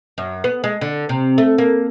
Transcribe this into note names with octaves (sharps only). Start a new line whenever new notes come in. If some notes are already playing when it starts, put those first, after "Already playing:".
F#2
B3
G#3
D3
C3
A3
A#3